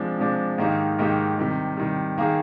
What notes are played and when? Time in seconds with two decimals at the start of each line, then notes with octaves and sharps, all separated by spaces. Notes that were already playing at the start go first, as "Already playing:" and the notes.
Already playing: C3 F3 G#3 D4
0.18 C3 F3 G#3 D4
0.58 G#2 D#3 A#3 D#4 G4
0.99 G#2 D#3 A#3 D#4 G4
1.38 C3 D#3 G3
1.77 C3 D#3 G3
2.18 D#3 A#3 D#4 G#4